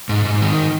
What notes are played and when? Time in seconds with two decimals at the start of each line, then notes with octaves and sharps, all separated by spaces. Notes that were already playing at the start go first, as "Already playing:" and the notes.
0.09 G#2
0.25 G#2
0.41 D#3